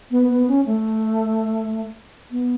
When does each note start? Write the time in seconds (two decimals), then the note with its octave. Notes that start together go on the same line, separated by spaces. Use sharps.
0.11 B3
0.29 B3
0.48 C#4
0.66 A3
2.31 B3